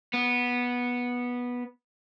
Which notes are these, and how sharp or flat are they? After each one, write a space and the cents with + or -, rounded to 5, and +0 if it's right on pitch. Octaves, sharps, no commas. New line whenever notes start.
B3 -10